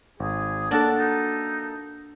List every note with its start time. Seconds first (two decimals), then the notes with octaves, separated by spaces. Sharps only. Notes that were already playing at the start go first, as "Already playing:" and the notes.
0.20 G#1 G#4
0.71 A#3 D4 F#4 A4 A#4 A5
0.99 D#4